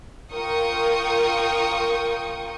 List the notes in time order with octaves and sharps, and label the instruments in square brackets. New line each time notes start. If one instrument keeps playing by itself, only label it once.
[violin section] F4 A#4 G5 C#6 D#6